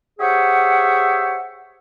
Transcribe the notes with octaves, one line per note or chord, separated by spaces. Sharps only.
G4 G#4 C5 C#5 E5 F#5